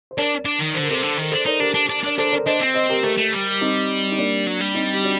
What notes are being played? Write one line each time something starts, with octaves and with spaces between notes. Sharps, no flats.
C5
D4 A#4 D5
D4
D#3
D3 C5
A#4
C3 A4 C5
D3
D#3 A#4
D4 A4 C5
D#4 A#4 D5
D4 G4 A#4
D4
D4
D4 D5
D4 A4 C5
A#4 D5
D4 C5 D#5
C4
C5 D#5
G4 A#4
A3 G4 A#4
A3
G3
C4 D#4
D#4
A#3 D4
F#3
G3
C4 D#4
G4
D4 F#4